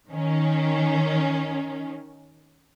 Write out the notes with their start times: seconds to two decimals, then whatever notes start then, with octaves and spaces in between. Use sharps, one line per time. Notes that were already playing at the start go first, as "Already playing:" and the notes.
0.12 D#3 C#4